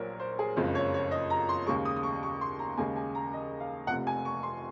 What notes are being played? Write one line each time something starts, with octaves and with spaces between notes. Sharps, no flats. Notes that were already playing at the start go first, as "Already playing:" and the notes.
Already playing: A#1 A#2 F#3 A#4 C5 C#5
C5
G#4
F#1 F2 C#3 G#3 C5
C#5
C#5
D#5
A#5
C6
D#2 C#3 G#3 C#6
D#6
D#6
C#6
C#6
C6
A#5
D#2 C#3 G#3 G#5
G#5
A#5
D#5
F5
F1 F2 C3 F#5
G#5
C#6
C6